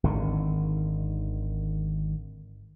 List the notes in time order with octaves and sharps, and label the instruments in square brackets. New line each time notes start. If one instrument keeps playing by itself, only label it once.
[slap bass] G#1 D3 D#3